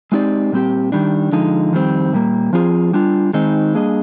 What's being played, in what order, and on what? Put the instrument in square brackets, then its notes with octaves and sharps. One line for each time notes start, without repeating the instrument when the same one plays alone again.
[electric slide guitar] G#3 C4 D#4 G4 D5
A#2 G3 C4 G4
D#3 G3 D4
D3 F3 G#3 D#4
F2 D#3 G3 C4
A#2 G3 A#3
F3 C4 F4 G#4
G3 D4 F4
D#3 G#3 C4 D#4
G3 A#3 D4 G#4 D#5